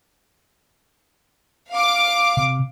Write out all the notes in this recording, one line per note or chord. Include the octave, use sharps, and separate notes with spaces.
F5 D6
C3